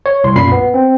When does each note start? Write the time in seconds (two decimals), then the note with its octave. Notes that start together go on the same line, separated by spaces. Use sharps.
0.06 C#5
0.24 C2 C6
0.35 B1 F#2 A#2 B5 C7
0.52 B3
0.74 C4